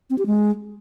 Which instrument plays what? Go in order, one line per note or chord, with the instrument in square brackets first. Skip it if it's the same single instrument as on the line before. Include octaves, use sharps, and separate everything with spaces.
[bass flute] C4
G4
G#3